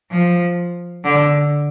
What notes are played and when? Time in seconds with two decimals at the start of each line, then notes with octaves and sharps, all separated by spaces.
0.11 F3
1.05 D3